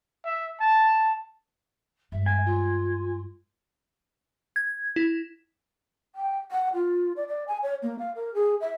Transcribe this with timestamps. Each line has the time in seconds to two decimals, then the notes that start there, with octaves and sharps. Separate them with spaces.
0.25 E5
0.60 A5
2.12 G2 G#3 E5
2.26 G#5
2.45 F4
4.56 G#6
4.96 E4
6.15 G5
6.52 F#5
6.74 F4
7.16 D5
7.28 D5
7.48 G#5
7.63 C#5
7.83 A#3
7.99 F5
8.16 A#4
8.34 G#4
8.61 E5